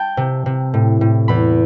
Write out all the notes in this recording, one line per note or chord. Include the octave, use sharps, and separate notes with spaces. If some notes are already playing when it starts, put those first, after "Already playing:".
Already playing: G5 A5
C3
C3
A2
A2
E2 B5